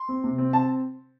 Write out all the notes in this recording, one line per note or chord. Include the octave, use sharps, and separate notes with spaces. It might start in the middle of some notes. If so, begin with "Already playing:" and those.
Already playing: C6
C4
C3
C4
C4 A5